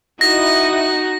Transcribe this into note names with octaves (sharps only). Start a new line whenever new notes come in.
D#4 E4 F#4 D#5 A#6